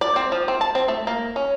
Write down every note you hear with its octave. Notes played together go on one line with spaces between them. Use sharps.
D5
C4
F3
C4
A5
C4
A3
A#3
C#4